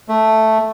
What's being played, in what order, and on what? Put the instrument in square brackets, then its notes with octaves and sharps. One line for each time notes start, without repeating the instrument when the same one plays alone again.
[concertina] A3